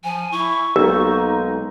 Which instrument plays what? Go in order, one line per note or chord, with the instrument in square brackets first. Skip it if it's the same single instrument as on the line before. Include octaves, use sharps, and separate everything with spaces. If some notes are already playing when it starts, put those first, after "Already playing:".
[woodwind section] F3 [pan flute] G#5
[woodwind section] E4 [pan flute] C#6
[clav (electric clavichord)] B1 [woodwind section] G#3 A#3 D#4 [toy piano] A#4